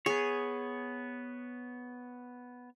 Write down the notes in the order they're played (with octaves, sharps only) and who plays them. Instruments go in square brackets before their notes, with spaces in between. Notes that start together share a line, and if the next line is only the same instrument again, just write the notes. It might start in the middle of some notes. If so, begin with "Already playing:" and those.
[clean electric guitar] B3 C#5 [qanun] G#4